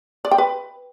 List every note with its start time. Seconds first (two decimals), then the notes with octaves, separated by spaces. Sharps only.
0.25 D5
0.31 G5
0.38 B4